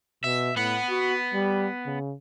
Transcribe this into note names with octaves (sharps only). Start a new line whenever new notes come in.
B2 E5
A2 B3 F#5
F#4
G3
C#3